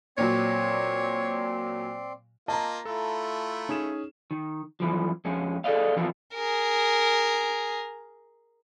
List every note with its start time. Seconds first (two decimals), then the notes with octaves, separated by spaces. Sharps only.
0.18 A#2 F#3 C4 C#5 D5 C6
2.48 A#3 F4 D#5 A5 A#5
2.85 A3 E4 F4 A4
3.69 C#4 D#4 G#4 E7
4.31 D#3
4.80 F#2 E3 F3
5.25 F2 G#3 C#4
5.64 G#4 A4 C5 D5 D#5 F5
5.97 E3 F3 C4 F4 A#4
6.34 G#4 A#4